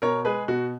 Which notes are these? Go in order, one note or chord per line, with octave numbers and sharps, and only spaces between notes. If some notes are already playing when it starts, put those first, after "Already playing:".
B2 A#4 C#5
G#3 G#4 B4
B2 F#4